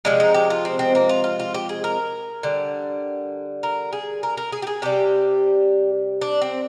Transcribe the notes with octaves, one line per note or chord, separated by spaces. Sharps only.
C3 F3 G#3 D4
D#4
G4
F4
C4
C4
A#3
F4
F4
F4
G4
G#4
A#4
D3 G3
A#4
G#4
A#4
A#4
G#4
G4
G#4
C3 G3 G4
D4
C4